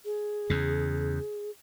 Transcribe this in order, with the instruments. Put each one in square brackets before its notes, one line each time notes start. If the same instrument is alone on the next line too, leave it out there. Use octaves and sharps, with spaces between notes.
[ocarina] G#4
[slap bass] E2 C#3